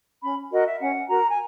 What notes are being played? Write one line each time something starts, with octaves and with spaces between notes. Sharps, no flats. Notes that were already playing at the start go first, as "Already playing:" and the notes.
C#4 B5
F#4 A#4 D#5
E5
C#4 F#5
F#4 A#4 A#5
G#5